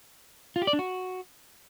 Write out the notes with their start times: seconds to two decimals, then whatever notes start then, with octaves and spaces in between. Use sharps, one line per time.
0.56 F4
0.62 G4
0.67 D5
0.73 D4
0.79 F#4